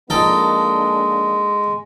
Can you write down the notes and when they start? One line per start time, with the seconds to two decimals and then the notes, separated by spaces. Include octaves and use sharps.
0.10 F3 G#3 A#3 D4 D#4 A4 G5